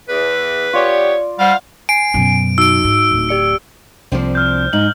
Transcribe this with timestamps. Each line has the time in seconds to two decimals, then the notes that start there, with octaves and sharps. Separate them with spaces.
0.09 E2 B4
0.73 B3 F4 G4 C#5 D5
1.39 G3 C5 F5 F#5
1.89 G#5 C7 D7
2.14 F#2 B2
2.58 D#4 F#4 E6 D7
2.84 G#2
3.11 D1
3.29 G4 D5 C#7
4.12 C2 F3 C4 D4 C5
4.35 F6 G6
4.73 G#2 D#4 F#7